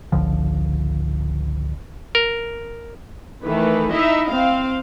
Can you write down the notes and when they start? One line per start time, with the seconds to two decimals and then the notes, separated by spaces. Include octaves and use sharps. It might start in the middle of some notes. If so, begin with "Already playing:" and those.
0.12 G#1 C#2 D3 F3
2.15 A#4
3.43 D#3 E3 A3 B4
3.91 D#4 E4 D#5 E5
4.27 C4 F5